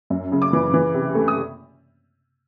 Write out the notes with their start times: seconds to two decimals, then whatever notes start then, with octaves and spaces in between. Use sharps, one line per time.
0.10 F#2
0.32 C#3
0.42 D6
0.53 E3
0.74 E3
0.94 C3
1.15 A3
1.28 D#6